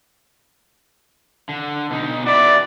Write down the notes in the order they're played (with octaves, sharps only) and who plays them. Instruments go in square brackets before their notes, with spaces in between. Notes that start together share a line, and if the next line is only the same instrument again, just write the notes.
[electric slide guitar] D3
B2 D#4
[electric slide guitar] F#4 B4 E5 [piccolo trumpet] D5